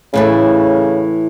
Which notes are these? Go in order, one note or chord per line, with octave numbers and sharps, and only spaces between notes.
A2 C#3 E3 A3